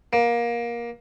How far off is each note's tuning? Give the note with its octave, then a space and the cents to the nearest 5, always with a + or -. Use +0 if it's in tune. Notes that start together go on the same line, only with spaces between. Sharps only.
A#3 +20